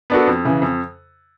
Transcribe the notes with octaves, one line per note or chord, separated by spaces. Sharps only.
B3 D4 F#4 A4
F2
C#3 E3
F2